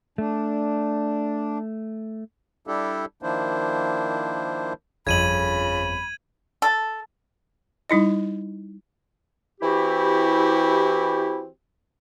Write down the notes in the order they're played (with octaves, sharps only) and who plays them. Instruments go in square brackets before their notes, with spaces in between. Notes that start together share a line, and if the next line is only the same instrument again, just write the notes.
[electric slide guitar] A3 [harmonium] D4
[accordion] G3 D4 E4 G4 A4
D#3 F3 A#3 D4 E4 C5
[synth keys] G1 F2 [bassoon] C#3 [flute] B5 [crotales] G#6 D#7 F#7
[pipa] A4
[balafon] G3 D#4 E4 D#5
[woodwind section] E3 C4 E4 F#4 G4